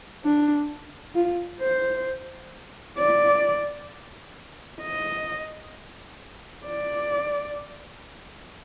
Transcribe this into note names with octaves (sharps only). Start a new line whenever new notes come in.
D4
F4
C5
D5
D#5
D5